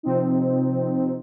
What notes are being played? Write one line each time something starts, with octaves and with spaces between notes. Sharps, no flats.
C3 F3 C4 D#4